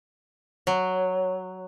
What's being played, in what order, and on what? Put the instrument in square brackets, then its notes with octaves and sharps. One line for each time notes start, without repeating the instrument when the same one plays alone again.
[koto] F#3